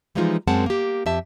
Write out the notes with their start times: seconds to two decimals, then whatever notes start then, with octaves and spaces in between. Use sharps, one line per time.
0.15 E3 F3 G3 G#3 D#4 F4
0.48 F#2 G#3 C4 A#4 F#5 A5
0.66 A#3 G4
1.06 F2 G4 E5 A5